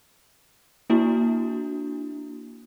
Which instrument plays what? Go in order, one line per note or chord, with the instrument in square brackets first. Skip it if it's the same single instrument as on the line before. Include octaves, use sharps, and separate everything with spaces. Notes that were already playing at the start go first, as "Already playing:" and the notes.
[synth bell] A#3 D4 E4 F#4